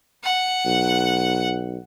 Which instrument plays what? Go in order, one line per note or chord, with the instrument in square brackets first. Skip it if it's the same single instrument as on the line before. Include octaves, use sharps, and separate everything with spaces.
[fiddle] F#5
[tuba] B1